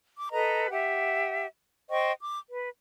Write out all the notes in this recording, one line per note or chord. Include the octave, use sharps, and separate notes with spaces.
D6
A4 B4 D#5 A#5
G4 E5 F#5
C5 D#5 G5 C#6
D6
B4